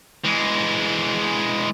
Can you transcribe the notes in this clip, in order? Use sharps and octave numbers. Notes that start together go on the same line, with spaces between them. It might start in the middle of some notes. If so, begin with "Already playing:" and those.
E3 G#3